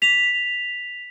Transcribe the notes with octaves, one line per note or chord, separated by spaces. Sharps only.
B6 F7